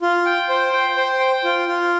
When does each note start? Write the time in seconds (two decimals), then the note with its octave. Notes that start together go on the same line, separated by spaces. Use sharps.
0.02 F4
0.26 G5
0.49 C5
0.72 G5
0.96 C5
1.20 G5
1.44 F4
1.68 F4